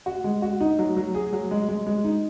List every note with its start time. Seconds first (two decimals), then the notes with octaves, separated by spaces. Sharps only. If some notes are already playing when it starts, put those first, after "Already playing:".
0.06 F#4
0.24 G#3
0.42 F#4
0.60 D#4
0.78 F#3
0.97 F#3
1.14 G#4
1.32 F#3
1.51 G#3
1.69 G#3
1.87 G#3
2.04 D#4